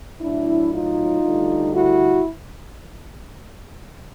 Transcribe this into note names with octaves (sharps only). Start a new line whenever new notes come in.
A2 F#3 D4 E4
D#4 F4
D2 D3 G3
E4 F#4